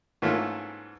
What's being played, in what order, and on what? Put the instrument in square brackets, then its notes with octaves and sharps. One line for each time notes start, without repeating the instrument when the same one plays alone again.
[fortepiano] G#2 E3 A3 A#3 C#4 F4